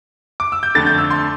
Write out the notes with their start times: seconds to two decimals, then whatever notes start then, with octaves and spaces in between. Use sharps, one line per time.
0.40 D6
0.52 E6
0.63 G6
0.75 F2 D3 A3 A6
0.87 G6
0.98 E6
1.11 C6